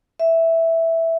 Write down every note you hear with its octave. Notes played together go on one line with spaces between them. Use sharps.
E5